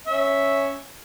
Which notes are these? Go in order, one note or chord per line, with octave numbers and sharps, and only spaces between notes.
C#4 E5